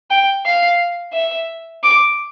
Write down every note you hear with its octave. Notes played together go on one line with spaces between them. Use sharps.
G5
F5
E5
D6